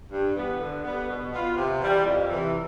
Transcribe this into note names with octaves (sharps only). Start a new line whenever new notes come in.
G2
E3 B3
D3
G3 B3
B2
B3 F4
C3
E3 G3
F2
C3 E3